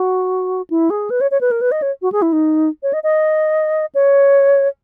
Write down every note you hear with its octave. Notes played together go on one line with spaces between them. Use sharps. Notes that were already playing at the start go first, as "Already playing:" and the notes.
Already playing: F#4
E4
G#4
B4
C#5
C#5
B4
A#4
B4
D#5
C#5
F#4
G#4
E4
D#4
C#5
D#5
D#5
C#5